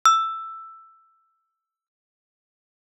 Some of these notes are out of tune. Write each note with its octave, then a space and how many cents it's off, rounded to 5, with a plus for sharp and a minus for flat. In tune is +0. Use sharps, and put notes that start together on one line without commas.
E6 +5